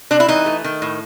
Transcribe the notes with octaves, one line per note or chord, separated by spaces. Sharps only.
C3 D4
E4
E3 D#4
A3
D#3
A2